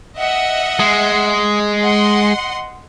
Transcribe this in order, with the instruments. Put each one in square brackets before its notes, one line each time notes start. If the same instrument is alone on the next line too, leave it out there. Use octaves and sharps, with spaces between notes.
[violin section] D#5 E5 F#5
[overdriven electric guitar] G#3
[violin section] D#5 F#5 C6